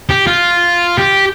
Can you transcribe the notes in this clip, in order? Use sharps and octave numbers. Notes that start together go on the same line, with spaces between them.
G4
F4
G4